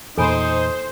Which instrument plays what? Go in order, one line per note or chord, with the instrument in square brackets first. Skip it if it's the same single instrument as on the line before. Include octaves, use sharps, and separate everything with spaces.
[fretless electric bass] E2 A#2 [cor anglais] D#4 [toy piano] A4 G#5 B5 [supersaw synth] C5